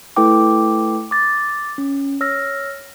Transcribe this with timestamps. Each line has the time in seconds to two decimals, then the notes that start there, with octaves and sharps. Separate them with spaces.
0.16 A3 E4 A4 B4 G5 D6
1.11 D6 A6
1.78 C#4
2.21 C#5 E6 F6 A#6